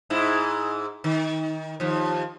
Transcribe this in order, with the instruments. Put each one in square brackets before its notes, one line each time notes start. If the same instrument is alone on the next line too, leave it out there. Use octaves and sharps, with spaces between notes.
[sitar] G#2 E4
D#3
D#2 F3